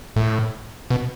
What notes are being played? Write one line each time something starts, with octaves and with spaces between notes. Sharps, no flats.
A2
B2